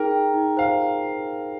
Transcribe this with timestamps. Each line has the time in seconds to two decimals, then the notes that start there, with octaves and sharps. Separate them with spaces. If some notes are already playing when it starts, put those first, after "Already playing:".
Already playing: D#4 G#4 A#4 G5
0.11 G5
0.34 D#4
0.57 C5 F5